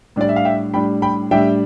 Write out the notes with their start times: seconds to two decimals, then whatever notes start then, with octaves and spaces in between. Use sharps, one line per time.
0.16 A2 G3 D4 D5
0.29 E5
0.36 F5
0.45 E5 G5
0.74 A2 G3 D4 G5 B5
1.02 G5 B5
1.31 A2 G3 D4 E5 G5